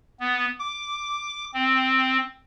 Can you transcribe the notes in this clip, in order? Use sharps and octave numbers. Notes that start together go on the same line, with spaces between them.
B3
D6
C4